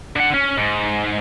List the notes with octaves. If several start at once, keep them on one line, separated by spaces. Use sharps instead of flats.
D3 F#5
C#4
G#2